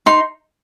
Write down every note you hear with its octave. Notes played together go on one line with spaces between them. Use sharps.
D#4 C6